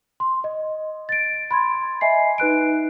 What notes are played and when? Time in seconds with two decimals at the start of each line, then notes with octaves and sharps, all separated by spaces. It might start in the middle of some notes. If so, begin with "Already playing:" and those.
0.20 C6
0.44 D#5
1.09 A6 D7
1.51 B5 C6 G#6
2.01 D#5 E5 G#5 C7
2.38 D#4 B4 F#6 D7